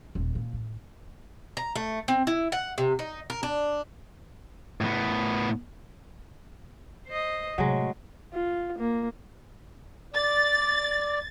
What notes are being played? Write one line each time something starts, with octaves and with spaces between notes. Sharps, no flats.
D#1
A#2
A1
A#5
A3
C4
E4
F#5
C3
D#4
A#4
D4
A2 B3
C5 D#5
A2 C3 F#3 G#3
F4
A#3
D5 A6